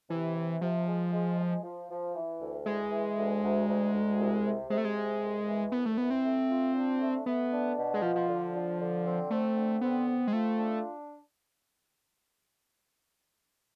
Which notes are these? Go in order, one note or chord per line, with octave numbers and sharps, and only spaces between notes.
C3 E3
C3
C3 F3
G#3
G#3
G#3
F3
F3
E3
D2
E3 G#3
E3
D2
D2
D2
D2
C2
C3
C3 G#3
A3
G#3
C3
C2
E3
C2 B3
A3
E3 B3
C4
A3
F4
D4
A3
A3 B3
D4
B2
G#3
F3 F4
F3
D3
D3
D3
C4
A3 C4
D3
B3 C4
C4
G#3
A3 F4
D4